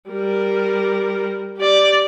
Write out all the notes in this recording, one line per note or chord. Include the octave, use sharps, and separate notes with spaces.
G3 A#4
G4 D5